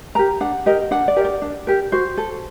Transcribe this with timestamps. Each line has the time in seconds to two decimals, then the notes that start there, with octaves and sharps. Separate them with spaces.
0.15 G4 A#4 A#5
0.40 D4 F#5
0.66 G4 A#4 D#5
0.91 D4 F#5
1.08 D5
1.16 G4 A#4
1.25 D5
1.42 D4
1.67 G4 A#4
1.92 F#4 C5
2.17 A4